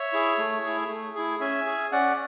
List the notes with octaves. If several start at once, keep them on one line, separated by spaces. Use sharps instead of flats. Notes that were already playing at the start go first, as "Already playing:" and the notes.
Already playing: C#5 E5
E4 G#4
A3
E4 G#4
A3
E4 G#4
C#4 E5 G#5
G#4
C#4 D5 F#5